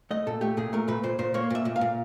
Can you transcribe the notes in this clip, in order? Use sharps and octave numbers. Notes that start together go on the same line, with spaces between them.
A3 D#5
A#2 A4
A3 G4
A#2 G#4
A3 A#4
A#2 B4
A#2 C5
A#2 C5
A#3 C#5
A#2 E5
A#2
F5
A#2